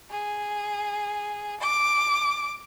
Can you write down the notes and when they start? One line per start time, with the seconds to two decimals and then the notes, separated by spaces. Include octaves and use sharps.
0.10 G#4
1.61 D6